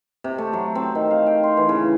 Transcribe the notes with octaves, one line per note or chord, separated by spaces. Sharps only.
C3
A3
F#3
C4
D#3
F5
G5
C6
E3
C#3